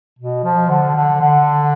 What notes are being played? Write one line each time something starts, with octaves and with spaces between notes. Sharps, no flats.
B2
F3
D3
D3
D3